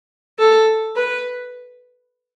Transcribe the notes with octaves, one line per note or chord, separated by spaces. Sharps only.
A4
B4